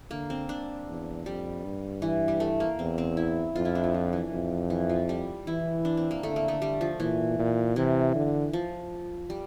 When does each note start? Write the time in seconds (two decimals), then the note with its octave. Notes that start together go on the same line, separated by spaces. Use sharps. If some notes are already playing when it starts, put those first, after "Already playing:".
0.11 D3 A#3
0.30 C4
0.49 D4
0.87 E2
1.26 F2 G3
1.64 G2
2.02 E3
2.28 G3
2.40 A3
2.60 A#3
2.78 E2 C4
2.98 C4
3.17 E4
3.55 F2 F4
3.65 E4
3.75 D4
3.84 F3
3.94 F3
4.13 E3
4.32 F2
4.70 E3
4.89 F3
5.09 G3
5.47 E3 E4
5.85 D4
5.97 C4
6.11 A#3
6.23 D3 A3
6.36 A#3
6.48 A3
6.62 G3
6.81 F3
6.99 A#2 E3
7.39 A#2
7.76 C3 E3
8.15 D3
8.53 F3
9.30 G3